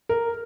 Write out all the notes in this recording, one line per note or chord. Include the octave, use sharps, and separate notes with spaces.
A#4